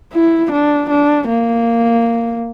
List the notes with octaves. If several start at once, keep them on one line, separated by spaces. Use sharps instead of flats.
E4
D4
D4
A#3